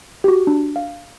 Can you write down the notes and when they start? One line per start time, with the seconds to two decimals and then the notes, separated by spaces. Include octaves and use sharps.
0.24 F#4 G4
0.47 D4
0.76 F5